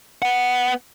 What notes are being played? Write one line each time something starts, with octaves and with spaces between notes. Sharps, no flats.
B3 F#5